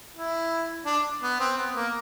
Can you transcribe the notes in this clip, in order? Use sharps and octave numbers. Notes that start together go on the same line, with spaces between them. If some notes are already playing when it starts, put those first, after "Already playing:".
E4
D4
B3
C4
B3
A#3